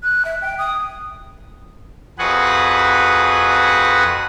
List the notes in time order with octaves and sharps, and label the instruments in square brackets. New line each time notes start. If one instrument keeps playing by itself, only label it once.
[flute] F#6
E5
G5
D#6
[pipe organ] F2 F#4 G#4 B4 F#5